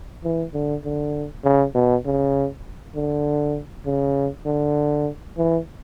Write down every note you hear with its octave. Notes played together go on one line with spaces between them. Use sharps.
E3
D3
D3
C#3
B2
C#3
D3
C#3
D3
E3